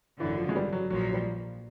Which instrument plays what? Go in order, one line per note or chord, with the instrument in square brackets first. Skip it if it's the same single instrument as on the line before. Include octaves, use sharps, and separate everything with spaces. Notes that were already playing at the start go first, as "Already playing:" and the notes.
[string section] G#1 F#2 D3 [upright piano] E3
[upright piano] F3
G#3
G3
F#3
[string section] A#1 A#2 F3 [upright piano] F#3
[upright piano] F#3
G3